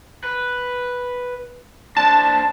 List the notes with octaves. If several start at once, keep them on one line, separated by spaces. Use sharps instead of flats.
B4
D4 C5 A5